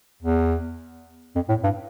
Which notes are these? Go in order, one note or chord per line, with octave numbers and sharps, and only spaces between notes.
E2
F2
A2
G2